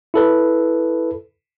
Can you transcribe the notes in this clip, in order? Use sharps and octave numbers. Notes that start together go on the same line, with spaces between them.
E4 A4 B4